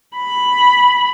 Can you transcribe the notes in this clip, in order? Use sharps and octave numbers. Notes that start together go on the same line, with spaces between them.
B5